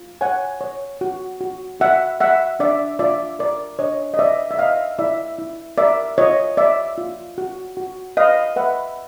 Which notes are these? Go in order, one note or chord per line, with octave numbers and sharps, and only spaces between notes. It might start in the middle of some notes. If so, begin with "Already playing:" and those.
Already playing: F4
C#5 F#5 G#5
C#5
F#4
F#4
F#4 E5 F#5
F#4 E5 F#5
D4 D5 E5
F4 D5 E5
A#4 D5
D4 C#5 D#5
D#5
B4 D5 E5
E5
B4 D#5 F5
E4 D5 E5
E4
A#4 D5 E5
F4 C#5 D#5
C#5 D5 E5
F4
F#4
F#4
B4 D#5 F5
B4 E5 F#5